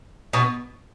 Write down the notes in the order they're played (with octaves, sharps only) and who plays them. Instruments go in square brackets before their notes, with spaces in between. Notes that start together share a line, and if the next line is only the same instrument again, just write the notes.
[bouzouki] B2 B3